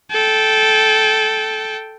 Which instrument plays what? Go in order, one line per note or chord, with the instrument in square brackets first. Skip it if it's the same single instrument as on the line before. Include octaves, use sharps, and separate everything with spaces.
[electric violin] A4 G5